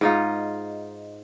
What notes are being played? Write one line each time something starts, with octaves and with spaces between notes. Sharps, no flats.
G#2 D#4 F4